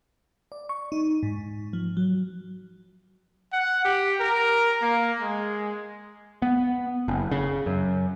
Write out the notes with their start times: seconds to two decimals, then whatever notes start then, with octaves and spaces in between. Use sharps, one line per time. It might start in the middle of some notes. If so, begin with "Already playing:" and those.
0.52 D5
0.69 C#6
0.92 D#4
1.23 G#2
1.73 F3
1.97 F#3
3.53 F#5
3.85 G4
4.20 A#4
4.82 A#3
5.21 G#3
6.42 B3
7.08 F#1
7.31 C#3
7.66 F#2